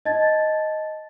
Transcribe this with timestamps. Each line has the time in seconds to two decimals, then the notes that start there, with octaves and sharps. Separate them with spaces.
0.05 D#5 A5 G#6 A6